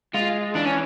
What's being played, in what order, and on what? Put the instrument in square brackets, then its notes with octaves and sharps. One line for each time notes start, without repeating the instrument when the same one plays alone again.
[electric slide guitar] G#3 [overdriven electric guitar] F4
[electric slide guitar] E3 [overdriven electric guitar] D4
[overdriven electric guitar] C#4